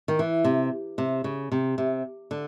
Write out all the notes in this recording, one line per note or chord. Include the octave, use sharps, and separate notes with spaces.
D#3
E3
C3
C3
C#3
C3
C3
D3